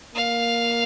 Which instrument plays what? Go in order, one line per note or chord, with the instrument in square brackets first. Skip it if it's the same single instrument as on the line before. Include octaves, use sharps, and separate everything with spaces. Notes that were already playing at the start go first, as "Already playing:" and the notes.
[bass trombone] A#3 [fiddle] F5